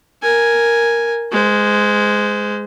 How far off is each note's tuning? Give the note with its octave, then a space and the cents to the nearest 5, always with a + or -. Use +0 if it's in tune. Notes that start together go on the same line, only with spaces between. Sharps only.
A#4 +0 G#5 +0
G#3 +0 C5 -35